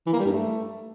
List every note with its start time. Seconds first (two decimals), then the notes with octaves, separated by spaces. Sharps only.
0.06 E3
0.13 A#3
0.19 G3
0.26 G2
0.32 A3